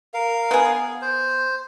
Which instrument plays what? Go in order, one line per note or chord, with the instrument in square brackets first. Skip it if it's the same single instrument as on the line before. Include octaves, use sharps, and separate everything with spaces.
[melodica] A#4 F5
[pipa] B3 G#4
[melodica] C5